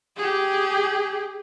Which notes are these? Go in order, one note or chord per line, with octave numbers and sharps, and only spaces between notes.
G4 G#4